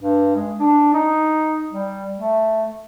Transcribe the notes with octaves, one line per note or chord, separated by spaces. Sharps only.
G2
G#3
D4
D#4
G3
A3